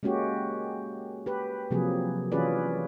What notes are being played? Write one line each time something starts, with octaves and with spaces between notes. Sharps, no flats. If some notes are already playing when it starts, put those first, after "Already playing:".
G#3 A#3 C#4 F#4 G4
G4 B4
C3 F3 F#3 A#3 G#4
E3 C#4 F4 G#4 B4 D5